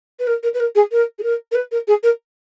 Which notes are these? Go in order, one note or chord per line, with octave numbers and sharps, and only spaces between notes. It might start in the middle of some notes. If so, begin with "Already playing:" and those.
B4
A#4
A#4
B4
A#4
G#4
A#4
G#4
A#4
A#4
B4
A#4
G#4
A#4